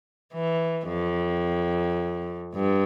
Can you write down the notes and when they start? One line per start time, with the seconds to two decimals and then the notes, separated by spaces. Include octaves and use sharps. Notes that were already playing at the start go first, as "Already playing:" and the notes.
0.33 E3
0.88 F2
2.54 G2